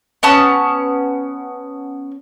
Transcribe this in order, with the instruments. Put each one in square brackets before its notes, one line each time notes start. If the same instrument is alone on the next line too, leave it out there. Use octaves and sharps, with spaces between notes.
[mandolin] B3 C#4 A5 D#6